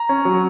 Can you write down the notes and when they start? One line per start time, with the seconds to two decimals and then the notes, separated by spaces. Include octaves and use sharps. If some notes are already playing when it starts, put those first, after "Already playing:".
Already playing: A#5
0.09 C#4
0.25 F#3